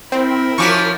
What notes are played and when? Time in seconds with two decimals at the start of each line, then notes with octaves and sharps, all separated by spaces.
0.12 C4 E4 A#4
0.58 F3 C#4 F#4 C#6 D6 B6